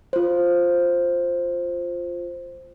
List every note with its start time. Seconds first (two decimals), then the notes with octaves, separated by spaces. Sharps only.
0.13 F4 C5